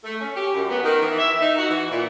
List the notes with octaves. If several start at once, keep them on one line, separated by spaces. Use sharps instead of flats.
A3
C#4
G4
F#2
B3
D#3
E3
E5
D#4
F#4
E3
A#2